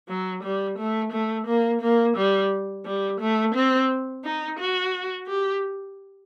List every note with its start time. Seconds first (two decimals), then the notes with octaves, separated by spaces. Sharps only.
0.09 F#3
0.43 G3
0.78 A3
1.12 A3
1.47 A#3
1.81 A#3
2.17 G3
2.85 G3
3.20 A3
3.55 C4
4.24 D#4
4.59 F#4
5.27 G4